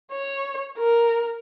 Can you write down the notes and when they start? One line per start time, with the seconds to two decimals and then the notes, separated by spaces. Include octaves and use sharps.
0.12 C#5
0.78 A#4